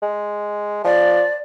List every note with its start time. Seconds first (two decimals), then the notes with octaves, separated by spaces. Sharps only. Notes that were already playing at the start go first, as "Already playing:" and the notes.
0.02 G#3
0.85 F3 D5